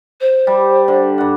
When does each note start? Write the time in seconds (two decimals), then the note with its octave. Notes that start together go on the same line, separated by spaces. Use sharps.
0.21 C5
0.47 G3
0.88 D3
1.18 G2 F#5